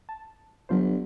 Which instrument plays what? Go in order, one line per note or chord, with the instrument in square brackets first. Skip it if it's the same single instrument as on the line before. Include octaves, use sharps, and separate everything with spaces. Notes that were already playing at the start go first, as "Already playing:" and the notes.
[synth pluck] A5
[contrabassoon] G1 [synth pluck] F#3 F4 C5